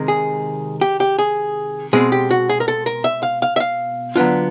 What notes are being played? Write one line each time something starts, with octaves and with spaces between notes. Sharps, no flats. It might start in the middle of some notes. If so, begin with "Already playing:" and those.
Already playing: C3 D#3 G#3
G#4
G4
G4
G#4
B2 G#3 C4 G#4
G4
F#4
G#4
A#4
A4
A#4
E5
F5
F5
E5
F5
D3 F#3 B3 D4 F4